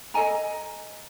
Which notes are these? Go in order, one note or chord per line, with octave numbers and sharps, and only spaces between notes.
A4 D#5 G#5 A#5